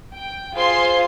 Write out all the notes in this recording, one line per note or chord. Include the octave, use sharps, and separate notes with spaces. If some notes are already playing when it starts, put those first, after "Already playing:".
G5
F4 G#4 C5 F5 C6